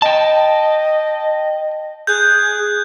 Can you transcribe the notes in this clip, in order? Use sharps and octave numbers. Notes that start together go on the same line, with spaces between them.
D#5 G5 A5
G#4 F#6 G6